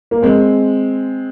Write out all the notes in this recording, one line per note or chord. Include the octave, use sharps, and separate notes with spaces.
A#3
G#3 C4